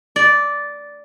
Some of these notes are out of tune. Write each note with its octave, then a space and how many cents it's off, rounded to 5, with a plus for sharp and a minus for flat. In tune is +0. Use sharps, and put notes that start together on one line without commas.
D5 -10